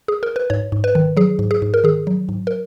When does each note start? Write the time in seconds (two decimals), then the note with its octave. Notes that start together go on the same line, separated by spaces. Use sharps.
0.08 G#4
0.23 A#4
0.36 B4
0.50 G#2 C#5
0.72 G#2
0.84 B4
0.95 D#3
1.17 F#3 G#4
1.39 G#2
1.51 G#4
1.62 G#2
1.74 A#4
1.84 D#3 G#4
2.07 F#3
2.29 G#2
2.47 A#4